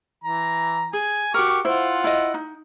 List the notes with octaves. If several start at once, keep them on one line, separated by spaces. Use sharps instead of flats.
E3 A#5
G#4 G#5
F#4 G4 A#4 C#6 D6
E4 F4 C5 F#5
E4 D#5
D#4